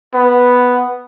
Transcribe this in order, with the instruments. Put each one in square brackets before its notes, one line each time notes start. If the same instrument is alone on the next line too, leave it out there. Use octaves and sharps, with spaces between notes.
[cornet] B3